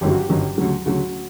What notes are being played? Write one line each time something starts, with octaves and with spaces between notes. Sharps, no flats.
G1 F#2 D#3 F#3 G4
F#4
G4
G1 F#2 D#3 F#3
D2 C#3 F#3
D2 C#3 F#3 F#4